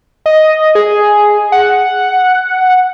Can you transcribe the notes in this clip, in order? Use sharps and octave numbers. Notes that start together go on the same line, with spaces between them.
D#5
G#4
F#5